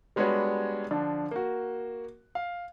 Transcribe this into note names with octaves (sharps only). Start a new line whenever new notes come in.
G3 G#3 B3 D4 F#4 C#5
D3 F3 D4
A#3 F#4
F5